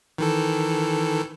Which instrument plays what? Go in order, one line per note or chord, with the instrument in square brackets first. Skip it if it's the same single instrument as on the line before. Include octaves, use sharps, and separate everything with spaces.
[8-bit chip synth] D#3 E3 A4